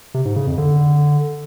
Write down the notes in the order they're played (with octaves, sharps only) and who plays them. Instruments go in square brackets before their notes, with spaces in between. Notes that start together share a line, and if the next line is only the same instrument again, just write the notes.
[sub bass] C3
G#2
C#3
F2
D3